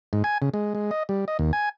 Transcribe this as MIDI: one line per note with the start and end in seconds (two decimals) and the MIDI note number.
0.13 0.23 44
0.24 0.38 80
0.42 0.49 49
0.54 0.74 56
0.75 0.91 56
0.91 1.03 75
1.09 1.25 55
1.28 1.37 75
1.39 1.52 39
1.53 1.69 80